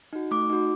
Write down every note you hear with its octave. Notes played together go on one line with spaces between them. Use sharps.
D#4 F#4
A3 D6
D#4 F#4